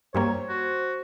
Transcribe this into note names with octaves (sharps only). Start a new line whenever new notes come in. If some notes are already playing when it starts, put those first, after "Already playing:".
G2 G3 A#3 C5 C#5
F#4